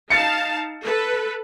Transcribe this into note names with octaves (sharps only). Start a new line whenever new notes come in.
D#4 F5 A5 A6 C#7
A4 B4